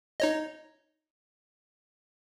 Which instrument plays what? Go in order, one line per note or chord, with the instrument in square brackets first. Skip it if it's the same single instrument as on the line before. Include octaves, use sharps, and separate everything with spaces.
[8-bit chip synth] D#4 C#5 D#5